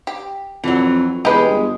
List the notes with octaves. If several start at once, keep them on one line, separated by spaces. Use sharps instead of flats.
G4
F2 E3 F#3
E2 G#3 G4 B4
G1